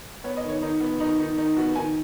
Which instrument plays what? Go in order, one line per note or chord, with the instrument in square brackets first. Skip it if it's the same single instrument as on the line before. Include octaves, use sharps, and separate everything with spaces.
[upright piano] B3 C#5
D#5
D#3
C#5
D#3 D#4
B3
D#3 D#4
D#3 D#4
D#3 D#4
B3 F#4
D#3 G#5